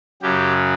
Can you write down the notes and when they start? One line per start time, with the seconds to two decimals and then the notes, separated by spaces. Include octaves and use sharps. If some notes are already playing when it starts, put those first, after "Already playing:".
0.22 F#2 C#3 F#3 G4